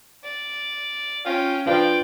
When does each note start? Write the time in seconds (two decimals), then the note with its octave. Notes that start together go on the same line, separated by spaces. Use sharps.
0.24 D5
1.26 C#4 F4 G5
1.66 F3 D4 F4 B4 D5 G5